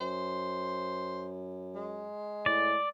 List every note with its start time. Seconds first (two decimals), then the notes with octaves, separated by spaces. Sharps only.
0.01 F#2 C5
1.75 G#3
2.46 A2 D5